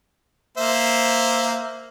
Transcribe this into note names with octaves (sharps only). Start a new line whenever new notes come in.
A#3 C5 E5